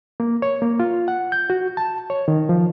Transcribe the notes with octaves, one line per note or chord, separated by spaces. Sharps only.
A#3
C#5
A#3
F4
F#5
G6
F#4
A5
C#5
D#3
F3